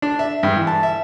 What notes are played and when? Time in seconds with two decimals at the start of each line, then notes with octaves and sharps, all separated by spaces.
0.02 D4
0.19 E5
0.43 G2
0.56 E3
0.67 A5
0.83 E5